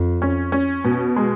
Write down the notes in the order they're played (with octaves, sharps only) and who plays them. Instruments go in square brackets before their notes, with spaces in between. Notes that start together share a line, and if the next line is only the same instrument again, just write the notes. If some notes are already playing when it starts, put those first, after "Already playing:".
Already playing: [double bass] F2
[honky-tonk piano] C#4
C#4
B2
G#3